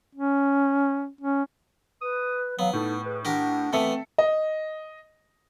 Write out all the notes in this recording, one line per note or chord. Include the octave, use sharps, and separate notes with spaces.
C#4
C#4
B4 D#6
F#3 B3 F5
A2 D#4 A4
G#4 B4
D4 G4 A#4 F#5
E3 A3 B3 C4 A4 E5 C#7
D#5